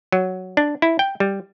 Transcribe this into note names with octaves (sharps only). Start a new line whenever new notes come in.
F#3
D4
E4
G5
G3